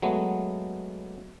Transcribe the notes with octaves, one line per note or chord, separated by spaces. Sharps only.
F#3 G#3 A3 B3